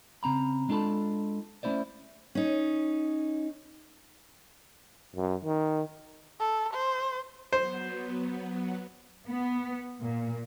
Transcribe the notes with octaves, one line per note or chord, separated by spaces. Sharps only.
C#3 C4 A#5 B5
G#3 D4 F4 A4 A5 B5
A3 C#4 E4 C5 D5
C#4 D#4
F#2
D#3
A4
C5
F#3 B3 C5
B3
A#2